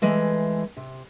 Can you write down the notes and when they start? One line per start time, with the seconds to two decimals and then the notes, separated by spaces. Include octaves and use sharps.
0.02 E3 G#3 A3
0.77 C3